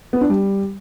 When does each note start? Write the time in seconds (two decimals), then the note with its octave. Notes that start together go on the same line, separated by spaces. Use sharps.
0.13 B3
0.21 D4
0.29 G3